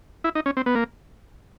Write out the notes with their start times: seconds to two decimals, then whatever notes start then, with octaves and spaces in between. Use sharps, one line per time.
0.24 E4
0.35 D#4
0.46 C#4
0.57 C4
0.66 B3
0.75 A#3